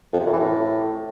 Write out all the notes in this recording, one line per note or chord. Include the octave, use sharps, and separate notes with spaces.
F2
C3
F#2
E3
A2